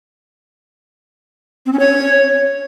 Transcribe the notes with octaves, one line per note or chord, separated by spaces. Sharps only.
C4
C#4
C#5